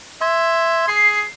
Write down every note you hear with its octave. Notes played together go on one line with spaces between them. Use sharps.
E5 C6 G#6
G#4 C7